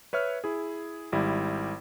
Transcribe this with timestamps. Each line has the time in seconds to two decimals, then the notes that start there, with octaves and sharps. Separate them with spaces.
0.13 B4 C#5 E5 F6
0.44 E4 G#4
1.12 G#1 G3 E4